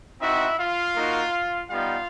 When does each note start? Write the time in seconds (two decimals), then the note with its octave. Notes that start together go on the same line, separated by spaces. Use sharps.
0.21 C4 D#4 E4 F#4 E5
0.59 F4 F5
0.96 A#3 D#4 F#4
1.70 G3 B3 D#4 F4 F5